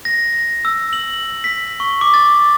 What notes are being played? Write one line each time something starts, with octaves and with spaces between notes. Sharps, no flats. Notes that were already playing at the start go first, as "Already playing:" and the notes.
A#6
E6
F#7
B6
C#6
D6
A6